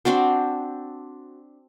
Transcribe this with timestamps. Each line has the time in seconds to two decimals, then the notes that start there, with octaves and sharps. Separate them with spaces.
0.05 C4 D4 F#4 C5